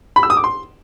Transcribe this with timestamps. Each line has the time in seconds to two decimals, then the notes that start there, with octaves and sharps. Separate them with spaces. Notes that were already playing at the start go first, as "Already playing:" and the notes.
0.16 B5
0.23 E6
0.30 D#6
0.37 D6
0.44 C6